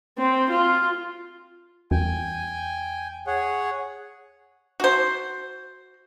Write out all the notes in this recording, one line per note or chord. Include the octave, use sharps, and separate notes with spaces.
C4
F4
E2 G5 G#5
G#4 C#5 F#5
F#4 C5